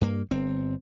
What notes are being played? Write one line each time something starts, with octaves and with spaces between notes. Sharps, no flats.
G2 A#3
G1 C4